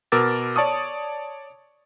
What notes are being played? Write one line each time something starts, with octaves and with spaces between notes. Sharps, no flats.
B2 A#4 D6 E6 A6
C#5 D5 A5 C#6 D#6